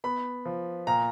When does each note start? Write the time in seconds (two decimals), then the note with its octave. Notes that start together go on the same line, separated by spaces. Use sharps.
0.04 B3 B5
0.45 F3
0.87 A#2 A#5